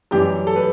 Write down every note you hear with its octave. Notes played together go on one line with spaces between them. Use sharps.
F#2 E3 G3 G4
A4
B4